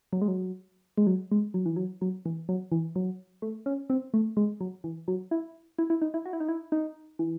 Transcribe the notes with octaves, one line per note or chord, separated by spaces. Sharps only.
F#3
G#3
F#3
G#3
F#3
G#3
F#3
E3
F#3
F#3
E3
F#3
E3
F#3
A3
C#4
C4
A3
G#3
F#3
E3
F#3
E4
E4
E4
D#4
E4
F#4
E4
D#4
E4
D#4
E3